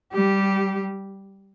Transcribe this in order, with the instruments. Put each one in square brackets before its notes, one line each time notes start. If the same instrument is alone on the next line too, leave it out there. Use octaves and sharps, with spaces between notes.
[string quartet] G3 G4